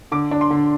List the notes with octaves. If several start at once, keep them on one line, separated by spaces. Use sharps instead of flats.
D3 D6
D4
C6
D3